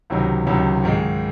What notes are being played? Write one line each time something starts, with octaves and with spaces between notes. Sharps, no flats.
C#2 C3 D#3 F#3
C#2 C3 D#3 F#3
G#2 D#3 G#3